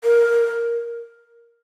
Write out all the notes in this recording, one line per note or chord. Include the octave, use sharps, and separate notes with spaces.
A#4